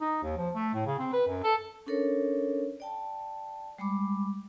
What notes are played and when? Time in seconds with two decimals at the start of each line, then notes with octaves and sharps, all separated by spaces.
0.01 D#4
0.23 D#2
0.37 F3
0.55 A3
0.74 A2
0.86 C#3
0.99 C4
1.13 B4
1.27 F#2
1.44 A4
1.86 C#4 D4 A4 A#4 C#5
2.80 D5 G5 A5
3.78 G3 G#3 B5 D6